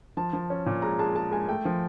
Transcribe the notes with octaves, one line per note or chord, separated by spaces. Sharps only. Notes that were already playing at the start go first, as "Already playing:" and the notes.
F3 A5
F3
C#4
A#2
G#3 A#5
G#3 A5
G#3 A5
G#3 G#5
A3 G5
F3